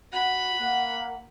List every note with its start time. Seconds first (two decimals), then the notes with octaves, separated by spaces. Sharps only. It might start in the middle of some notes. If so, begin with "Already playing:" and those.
0.12 F#4 F#5 B5
0.59 A#3